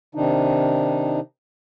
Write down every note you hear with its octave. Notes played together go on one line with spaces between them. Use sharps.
C3 D#3 D4 D#4